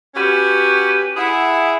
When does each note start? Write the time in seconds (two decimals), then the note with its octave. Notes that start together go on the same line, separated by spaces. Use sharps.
0.15 C#4 F#4 G4 B4
1.16 E4 G#4 E5 F#5